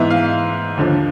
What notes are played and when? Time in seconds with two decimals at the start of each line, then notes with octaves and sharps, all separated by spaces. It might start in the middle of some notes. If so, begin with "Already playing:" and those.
Already playing: G#2 E3 G#3 B3 E5
0.10 F5
0.77 D#2 D3 F3